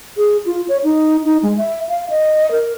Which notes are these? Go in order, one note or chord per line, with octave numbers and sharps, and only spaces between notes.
G#4
F4
C#5
D#4
D#4
G#3
E5
F5
D#5
A#4